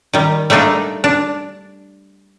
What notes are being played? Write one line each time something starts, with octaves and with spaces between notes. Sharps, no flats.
D#3 G3
G3 A3 A#3 D4 D#4
D4